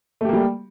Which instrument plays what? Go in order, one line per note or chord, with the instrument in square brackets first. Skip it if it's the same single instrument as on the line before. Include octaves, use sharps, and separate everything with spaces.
[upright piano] A3
G4
A#3
G3